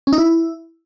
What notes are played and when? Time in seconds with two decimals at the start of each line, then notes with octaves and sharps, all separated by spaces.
0.07 C#4
0.13 D#4
0.18 E4